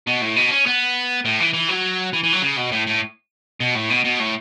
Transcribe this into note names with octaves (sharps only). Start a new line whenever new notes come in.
B2
A2
B2
C#4
B3
A2
E3
E3
F#3
E3
E3
F#3
C#3
B2
A2
A2
B2
A2
B2
B2
A2